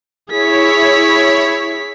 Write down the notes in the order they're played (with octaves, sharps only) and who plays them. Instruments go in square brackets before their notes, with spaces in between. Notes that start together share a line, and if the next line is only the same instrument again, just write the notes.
[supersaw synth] E4 C#5 [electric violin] G#4 B6